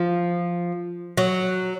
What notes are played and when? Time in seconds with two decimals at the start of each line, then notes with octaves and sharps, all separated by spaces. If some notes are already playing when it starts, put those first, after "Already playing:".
Already playing: F3
1.17 F#3